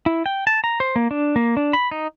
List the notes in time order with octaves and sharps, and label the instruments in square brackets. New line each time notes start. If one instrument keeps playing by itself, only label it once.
[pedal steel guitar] E4
G5
A5
A#5
C5
A#3
D4
A#3
D4
B5
D#4